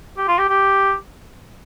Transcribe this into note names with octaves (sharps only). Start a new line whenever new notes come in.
G4
F4
G4
G4